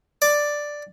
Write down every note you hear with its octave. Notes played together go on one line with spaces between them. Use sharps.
D5